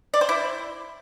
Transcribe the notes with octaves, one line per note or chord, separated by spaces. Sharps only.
D5
C5
E4